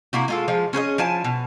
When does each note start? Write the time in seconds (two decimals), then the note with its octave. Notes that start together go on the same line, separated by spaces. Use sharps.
0.13 C3 A#3 E4 F#4
0.28 G#3 F4 A4
0.48 F3 G#3 F4
0.73 C#4 G#4 B4 D#5
0.98 F3 E4 G#5 A5
1.24 B2